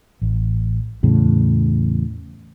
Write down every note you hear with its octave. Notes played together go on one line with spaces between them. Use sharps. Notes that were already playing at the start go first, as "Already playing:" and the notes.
A1
E2 A2 C#3